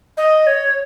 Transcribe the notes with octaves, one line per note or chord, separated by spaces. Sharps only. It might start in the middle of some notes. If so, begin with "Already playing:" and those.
D#5
C#5